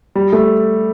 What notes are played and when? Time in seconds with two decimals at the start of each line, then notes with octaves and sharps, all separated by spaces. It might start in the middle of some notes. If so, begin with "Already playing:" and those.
0.15 G3
0.33 A3